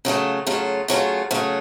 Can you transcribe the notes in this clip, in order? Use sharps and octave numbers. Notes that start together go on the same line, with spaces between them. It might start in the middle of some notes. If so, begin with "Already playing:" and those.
C#3 F#3 A3 F4
C#3 F#3 A3 F4
C#3 F#3 A3 F4
C#3 F#3 A3 F4